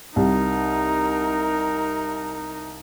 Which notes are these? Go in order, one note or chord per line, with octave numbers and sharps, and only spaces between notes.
C2 D#4 A#4